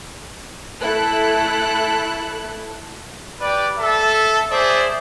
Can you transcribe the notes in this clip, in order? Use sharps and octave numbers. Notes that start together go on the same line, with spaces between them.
A3 E4 A4 F#6
G4 B4 D5
A4 E5
G#4 C5 D5 E5